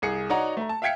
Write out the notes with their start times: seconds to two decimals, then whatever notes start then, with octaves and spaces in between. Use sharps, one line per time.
0.02 C2 G#4 C#7
0.30 D#4 F#4 C#5 D5 F#5 A#5
0.57 A3 A#5
0.69 A5
0.82 E5 F5 G5 G#6 B6 C#7